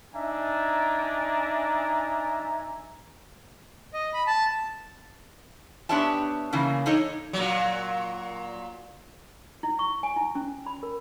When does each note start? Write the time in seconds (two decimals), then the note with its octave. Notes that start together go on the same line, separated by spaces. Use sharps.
0.15 D4 D#4 E5 G#5 A#5
3.94 D#5
4.13 B5
4.27 A5
5.89 B3 D4 G4 C#5 E5 A5
6.53 C#3 E3 A#3
6.86 D4 D#4 A4 C#5 D#5
7.33 A#2 F#3
9.63 E4
9.79 C#6
10.03 G#5
10.16 E4
10.35 C#4
10.66 B5
10.83 A#4